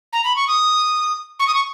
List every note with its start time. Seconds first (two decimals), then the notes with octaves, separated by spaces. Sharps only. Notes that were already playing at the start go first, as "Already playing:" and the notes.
0.13 A#5
0.24 B5
0.36 C#6
0.47 D#6
1.40 C#6
1.47 D#6
1.55 C#6